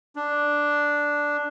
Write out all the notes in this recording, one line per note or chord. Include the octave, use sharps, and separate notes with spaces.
D4